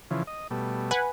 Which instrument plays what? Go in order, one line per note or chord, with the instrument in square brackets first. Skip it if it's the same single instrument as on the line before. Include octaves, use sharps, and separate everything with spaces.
[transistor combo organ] C#3 E3 F3
D#5
B2 G3 A3
[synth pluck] B4 F#5 G#5